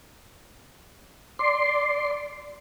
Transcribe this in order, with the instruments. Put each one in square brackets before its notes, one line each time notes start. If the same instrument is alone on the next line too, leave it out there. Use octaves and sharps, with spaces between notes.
[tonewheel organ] D5 C6